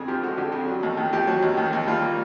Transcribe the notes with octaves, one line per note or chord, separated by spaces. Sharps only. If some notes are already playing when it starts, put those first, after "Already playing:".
Already playing: F2 D3 G#3 G#4
F3 G4
G#3 F#4
D3 G4
F2
F#3
D#2
D#3
D#2 G4
F#3
D#2
D#3
D#2
G3 F4
A#3